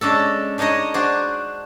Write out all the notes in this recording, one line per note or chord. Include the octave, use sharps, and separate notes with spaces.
G#3 C#4 D4 A4
D4 D#4 G#4 C#5 D#5
D4 F#4 G#4 C5 D5